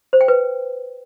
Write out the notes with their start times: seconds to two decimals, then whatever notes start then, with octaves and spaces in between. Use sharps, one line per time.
0.13 C5
0.21 G5
0.28 B4